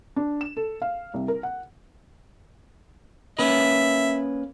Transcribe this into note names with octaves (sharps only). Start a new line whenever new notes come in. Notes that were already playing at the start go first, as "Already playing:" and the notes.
D4
E7
A4
F5
C2
A#4
F#5
A#3 C#4 B4 E5